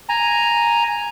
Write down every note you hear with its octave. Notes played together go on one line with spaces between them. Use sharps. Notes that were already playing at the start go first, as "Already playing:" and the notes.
G#5 A#5